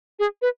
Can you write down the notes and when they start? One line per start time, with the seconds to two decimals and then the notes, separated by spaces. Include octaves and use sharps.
0.19 G#4
0.42 B4